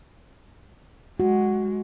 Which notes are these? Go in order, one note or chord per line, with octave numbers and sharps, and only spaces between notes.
G#3 F#4